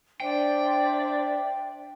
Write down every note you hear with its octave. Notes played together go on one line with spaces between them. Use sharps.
D4 C5 D5 E5 G5